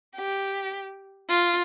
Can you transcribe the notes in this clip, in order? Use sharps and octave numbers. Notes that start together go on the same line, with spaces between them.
G4
F4